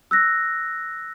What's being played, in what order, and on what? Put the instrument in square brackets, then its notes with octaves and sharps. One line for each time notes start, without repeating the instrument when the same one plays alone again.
[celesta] E6 F#6 A#6